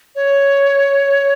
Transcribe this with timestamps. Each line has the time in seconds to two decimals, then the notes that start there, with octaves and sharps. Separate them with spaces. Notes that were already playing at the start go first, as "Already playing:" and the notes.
0.15 C#5